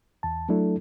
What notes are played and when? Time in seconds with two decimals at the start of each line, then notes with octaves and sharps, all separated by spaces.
0.23 E2 A5
0.49 F#3 A3 D4 E4 A4